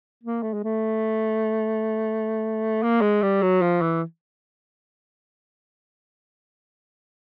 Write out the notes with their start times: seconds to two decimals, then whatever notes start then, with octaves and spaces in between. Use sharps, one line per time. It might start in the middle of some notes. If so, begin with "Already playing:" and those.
0.24 A#3
0.43 A3
0.53 G#3
0.64 A3
2.82 A#3
3.01 G#3
3.22 G3
3.42 F#3
3.61 F3
3.81 E3